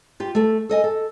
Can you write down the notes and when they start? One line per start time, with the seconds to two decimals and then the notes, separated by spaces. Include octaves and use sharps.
0.20 F4 G4
0.35 A3 A4
0.69 A4 D#5 G#5
0.84 A4